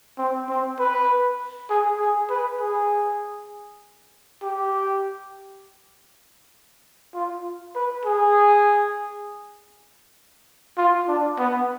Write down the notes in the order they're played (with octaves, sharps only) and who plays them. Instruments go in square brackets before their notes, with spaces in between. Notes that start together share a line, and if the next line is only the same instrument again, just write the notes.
[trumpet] C4
C4
B4
G#4
G#4
B4
G#4
G4
F4
B4
G#4
F4
D4
B3